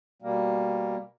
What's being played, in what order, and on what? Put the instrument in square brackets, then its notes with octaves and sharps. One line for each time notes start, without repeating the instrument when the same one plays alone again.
[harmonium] B2 G3 A#3